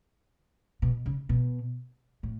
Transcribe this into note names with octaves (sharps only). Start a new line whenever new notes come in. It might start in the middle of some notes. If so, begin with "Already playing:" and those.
B2
C#3
B2
A2